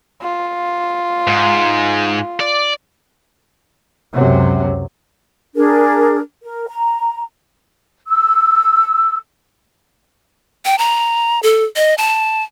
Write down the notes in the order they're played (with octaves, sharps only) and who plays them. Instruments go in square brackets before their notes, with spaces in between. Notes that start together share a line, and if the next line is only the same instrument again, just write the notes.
[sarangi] F4
[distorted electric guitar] G#2
D5
[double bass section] C#2 F#2 C3 F#3
[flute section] D4 G#4 A#4
A#4
A#5
E6
[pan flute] G5
A#5
A4
D#5
A5